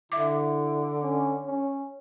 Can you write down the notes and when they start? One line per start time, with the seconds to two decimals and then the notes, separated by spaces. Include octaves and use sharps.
0.12 D3 E4 E5 D6
1.03 C#4
1.46 C#4